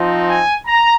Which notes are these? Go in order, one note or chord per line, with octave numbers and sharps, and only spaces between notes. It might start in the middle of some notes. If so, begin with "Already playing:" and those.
Already playing: F3 C4 D#4
G#5
A#5